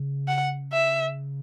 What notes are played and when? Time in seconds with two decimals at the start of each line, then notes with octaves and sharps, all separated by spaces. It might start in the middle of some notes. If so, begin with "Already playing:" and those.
Already playing: C#3
0.28 F#5
0.73 E5